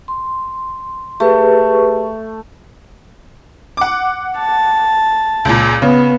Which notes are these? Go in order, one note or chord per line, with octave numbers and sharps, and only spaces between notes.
C6
A3 G4 G#4 B4
F#5 D6
A5
C#2 A#2
C#3 B3